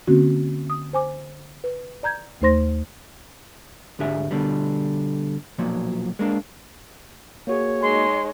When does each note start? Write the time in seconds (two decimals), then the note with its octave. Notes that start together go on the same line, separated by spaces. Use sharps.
0.08 D3 A#3 C4 C#4 F#4
0.70 D#6
0.93 C5 G#5 D6
1.64 B4
2.03 D5 A#5 G6 G#6
2.41 D#2 A3 D#4 C5 C6 A#6
3.99 D2 G#2 D4 G4 G#4 E5
4.31 B2 D3 G3
5.58 B1 A#2 F3 F#3
6.19 G#3 A#3 C#4 D4
7.47 A#3 F#4 G#4 C#5
7.82 G#3 D#4 C6